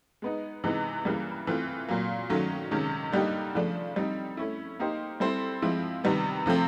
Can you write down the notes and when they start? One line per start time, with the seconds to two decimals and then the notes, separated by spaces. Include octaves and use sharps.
0.22 G#3 B3 D#4
0.64 C3 E3 G#3 B3 D#4
1.05 C#3 E3 G3 A#3
1.47 E3 A3 C4 F4
1.89 A#2 F#3 A#3
2.30 D#3 F#3 A3 C#4
2.71 C3 D#3 G#3 C#4
3.12 D3 G3 A#3 D#4 G4
3.55 C#3 F3 A3 D4
3.96 G3 C4 D#4
4.37 A3 C#4 E4
4.80 A#3 D#4 G4 C5
5.20 G3 C4 E4 A4 C5
5.62 F3 G#3 C4 E4
6.04 C3 D#3 G3 B3
6.46 C3 F3 A3 C4